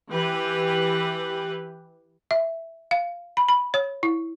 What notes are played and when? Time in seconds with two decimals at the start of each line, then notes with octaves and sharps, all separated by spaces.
0.12 E3 G4 B4
2.31 E5
2.91 F5
3.37 B5
3.48 B5
3.74 C#5
4.03 E4